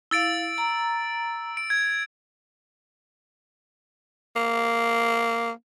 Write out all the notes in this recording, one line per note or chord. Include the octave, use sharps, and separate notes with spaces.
E4 F5 E6 A6 D7
A#5
D7
G#6
A#3